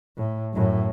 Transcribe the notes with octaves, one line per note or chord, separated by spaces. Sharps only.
A2
F#2 A2